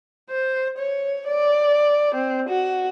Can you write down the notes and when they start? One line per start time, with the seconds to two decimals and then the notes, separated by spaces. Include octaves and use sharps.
0.30 C5
0.78 C#5
1.27 D5
2.15 C4
2.49 F#4